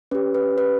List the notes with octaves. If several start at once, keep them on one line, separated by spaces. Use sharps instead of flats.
C#4 G4 B4
B4
B4